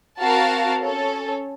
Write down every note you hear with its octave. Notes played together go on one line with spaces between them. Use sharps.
C4 F#4 A#4 F5 A5
C#4 A4 C#5